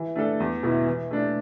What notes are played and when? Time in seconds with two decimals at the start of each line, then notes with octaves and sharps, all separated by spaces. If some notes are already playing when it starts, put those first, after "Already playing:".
Already playing: E3
0.15 A3 D4 A4
0.40 E2
0.63 B2 B3 E4
0.87 E3
1.11 A3 D4